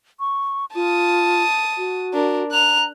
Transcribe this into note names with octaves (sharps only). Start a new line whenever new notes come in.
C#6
F4 A5 D#6
F#4
D4 A#4
A#5 F#6 F7